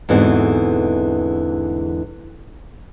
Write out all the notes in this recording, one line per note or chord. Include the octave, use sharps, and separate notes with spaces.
E2 G#2 D3 E3 C4 F#4